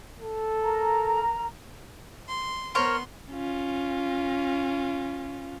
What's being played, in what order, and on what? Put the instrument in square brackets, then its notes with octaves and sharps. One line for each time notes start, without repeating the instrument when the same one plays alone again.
[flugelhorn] A4
[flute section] A#4 A#5
[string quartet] C6
[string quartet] B3 C6 [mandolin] A#4 C5 C#5
[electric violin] C#4 F4